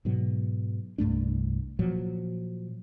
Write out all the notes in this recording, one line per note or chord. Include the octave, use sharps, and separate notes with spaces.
G#2 B2 F#3
C2 G2 A3 D4
A#2 F3 F#3